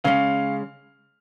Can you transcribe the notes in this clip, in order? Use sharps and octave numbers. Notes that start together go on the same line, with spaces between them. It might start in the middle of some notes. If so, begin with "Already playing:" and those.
C#3 G#3 C#4 F5